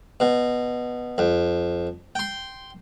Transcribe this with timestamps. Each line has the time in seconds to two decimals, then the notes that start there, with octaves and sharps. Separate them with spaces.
0.20 B2
1.18 F2
2.15 G5 C6